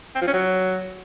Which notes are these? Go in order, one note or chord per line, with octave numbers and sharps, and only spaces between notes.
C4
F3
C#4
F#3